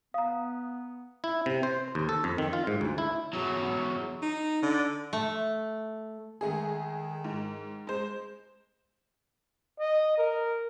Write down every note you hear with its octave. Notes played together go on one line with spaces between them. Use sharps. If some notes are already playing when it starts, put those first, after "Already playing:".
B3 F5 A#5 D#6
E4
C3
C5
D#2
A4
F2
D#3
F4
G#2
D2
E4
E2 F#3
D#4
D3
A3
D#3 G#3 A3 G#4
G#2
G#3 C5
D#5
A#4